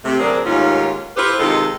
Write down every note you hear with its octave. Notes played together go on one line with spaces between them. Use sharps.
C3 A3
D2 F#3 C4 D4 G#4 A#4
D#2 G#2 A3 C#4 F4
E4 F4 G4 A4 B4 C5
C3 D#3 G#3 F4 A4